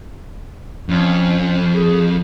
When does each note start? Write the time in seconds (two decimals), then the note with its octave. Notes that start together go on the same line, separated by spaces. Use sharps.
0.89 F2 C#4
1.74 G#4